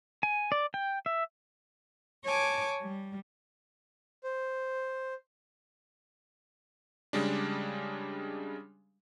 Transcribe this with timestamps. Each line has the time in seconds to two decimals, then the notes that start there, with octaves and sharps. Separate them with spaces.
0.23 G#5
0.52 D5
0.74 G5
1.06 E5
2.24 C#5 G#5 A5 D6
2.81 G3
4.23 C5
7.13 C#3 G3 G#3 D4